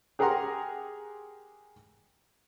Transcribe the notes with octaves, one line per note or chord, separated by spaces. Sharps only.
G4 G#4 A#4 F#5 A#5 C6